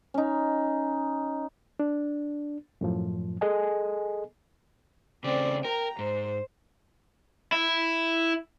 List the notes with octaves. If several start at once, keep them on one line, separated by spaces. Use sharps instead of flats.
C#4 D#4
D4
F#2 A2 F3
G#4 A4 D#5 G#5
C#3 A3 C4 D5
A#4 G5 A#5
G#2 C5
E4